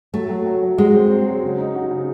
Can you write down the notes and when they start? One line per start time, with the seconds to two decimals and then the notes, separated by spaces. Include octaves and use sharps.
0.14 F#3 A3
0.29 F#3
0.46 F#3
0.62 F#3
0.78 G#3 F#4
0.94 C4
1.10 C4
1.26 F#3
1.43 C#3
1.58 D#4
1.75 F#4
1.91 C#3